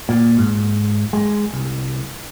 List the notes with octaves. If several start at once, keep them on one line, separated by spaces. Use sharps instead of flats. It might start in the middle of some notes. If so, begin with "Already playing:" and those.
A#2
G#2
G#3
C2